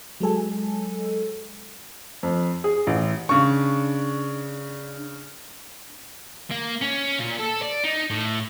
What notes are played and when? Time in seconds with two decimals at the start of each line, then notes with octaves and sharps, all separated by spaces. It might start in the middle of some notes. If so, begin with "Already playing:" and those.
0.20 F#3 G#3 A4 G#5
2.23 F2
2.64 G#4
2.87 A1
3.29 C#3 D4 C#6
6.51 A#3
6.81 C#4
7.19 A#2
7.39 A4
7.62 D5
7.84 D#4
8.10 A2